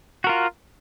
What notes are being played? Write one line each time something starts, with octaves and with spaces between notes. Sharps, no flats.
F4 F#4 A#4